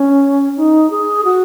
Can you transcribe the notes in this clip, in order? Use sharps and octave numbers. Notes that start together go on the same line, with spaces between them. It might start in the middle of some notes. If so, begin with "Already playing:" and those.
Already playing: C#4
D#4
G#4
F#4